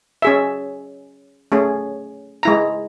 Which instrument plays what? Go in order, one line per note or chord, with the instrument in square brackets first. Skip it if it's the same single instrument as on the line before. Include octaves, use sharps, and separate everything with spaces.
[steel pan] C#4 G#4 E5
A3 C#4 G#4
G#3 E4 A#5